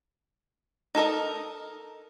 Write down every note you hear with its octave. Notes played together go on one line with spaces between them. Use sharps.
D#4 A4 A#4 D#5